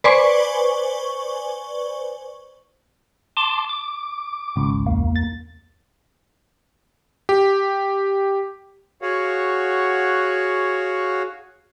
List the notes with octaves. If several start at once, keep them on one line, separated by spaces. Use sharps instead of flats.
B4 C5 D5 G#5 C#6
A5 C6 D6
D6
G#1 C#2
E2 A#3
A6
G4
F#4 G#4 C#5 F5 F#5